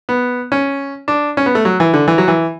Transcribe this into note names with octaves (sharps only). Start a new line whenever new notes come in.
B3
C#4
D4
C#4
B3
A3
F#3
E3
D3
E3
F#3
E3